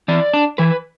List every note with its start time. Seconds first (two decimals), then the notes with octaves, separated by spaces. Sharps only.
0.08 E3 D5
0.34 D4
0.58 E3 B4